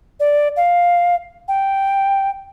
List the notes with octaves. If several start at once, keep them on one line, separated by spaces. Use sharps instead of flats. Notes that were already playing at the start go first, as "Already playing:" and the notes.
D5
F5
G5